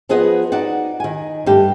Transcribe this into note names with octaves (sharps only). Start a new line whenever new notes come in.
F3 B3 G#4 B4 D#5 F#5
D#4 F#4 D5 F#5
D#3 G#5
G2 A3 G4